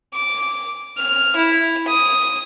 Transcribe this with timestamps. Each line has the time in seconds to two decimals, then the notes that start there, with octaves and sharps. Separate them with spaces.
0.13 D6
0.97 F6
1.36 E4
1.87 D#6